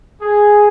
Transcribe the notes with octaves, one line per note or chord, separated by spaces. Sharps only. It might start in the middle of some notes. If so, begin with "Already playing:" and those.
G#4